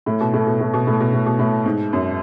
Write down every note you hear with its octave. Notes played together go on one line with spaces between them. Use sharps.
A2
B2
A2
B2
A2
B2
A2
B2
A2
B2
A2
G#2
F#2